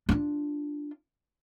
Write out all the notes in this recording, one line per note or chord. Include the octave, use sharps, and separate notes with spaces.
D4 F4